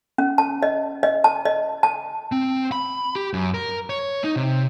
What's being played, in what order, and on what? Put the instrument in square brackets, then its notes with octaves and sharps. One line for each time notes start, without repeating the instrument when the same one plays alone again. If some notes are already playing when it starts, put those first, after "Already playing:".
[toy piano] C#4
A5
D#5
D#5
A5
D#5
A5
[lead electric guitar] C4
B5
G4
F#2
A#4
C#5
D#4
C3